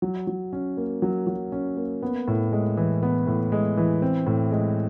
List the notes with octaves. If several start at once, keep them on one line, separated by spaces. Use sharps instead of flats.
F#3
F#3
C#4
A#3
F#3
F#3
C#4
A#3
B3
A2
G#3
E3
B3
A2
G#3
E3
C4
A2
G#3